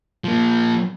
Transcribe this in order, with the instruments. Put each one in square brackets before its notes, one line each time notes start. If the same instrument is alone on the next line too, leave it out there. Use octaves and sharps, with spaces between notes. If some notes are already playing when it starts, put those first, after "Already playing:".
[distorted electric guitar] F3 A#3